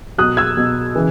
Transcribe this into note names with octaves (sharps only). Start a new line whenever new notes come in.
B2 F#3 D#6 F#6
E6 G#6
B2 F#3
C#3 E3